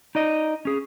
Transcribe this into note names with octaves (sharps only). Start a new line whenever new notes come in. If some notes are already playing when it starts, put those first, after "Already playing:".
D#4 D5 D#5
C#4 G#4